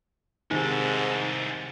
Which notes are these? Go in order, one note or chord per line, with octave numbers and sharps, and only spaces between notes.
C2 G#2 C3 D#3 D#4 A4